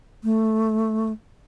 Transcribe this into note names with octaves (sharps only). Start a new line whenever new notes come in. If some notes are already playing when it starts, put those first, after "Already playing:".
A3